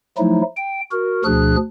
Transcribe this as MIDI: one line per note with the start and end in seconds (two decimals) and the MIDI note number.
0.18 0.42 53
0.18 0.42 54
0.18 0.42 57
0.18 0.42 63
0.18 0.42 64
0.57 0.81 79
0.92 1.23 66
0.92 1.23 70
1.25 1.56 38
1.25 1.56 47
1.25 1.56 53
1.25 1.56 62
1.25 1.56 68
1.25 1.56 90